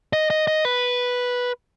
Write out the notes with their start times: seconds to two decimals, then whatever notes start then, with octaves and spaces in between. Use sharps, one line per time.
0.13 D#5
0.30 D#5
0.47 D#5
0.65 B4